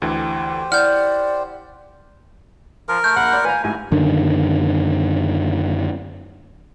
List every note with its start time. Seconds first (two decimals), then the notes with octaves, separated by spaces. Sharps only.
0.02 D2 D3 E3 G4 C5
0.72 E4 D5 F#5 F6 G6
2.89 F3 A#4
3.04 A3 G6
3.16 A#1 F#5
3.31 D5 B5 C6
3.45 B4 F5 G#5 A#5
3.64 A1 G#2 G#5
3.92 F#2 D3 D#3